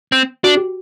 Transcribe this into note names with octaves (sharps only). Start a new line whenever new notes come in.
C4
D4 F#4
G4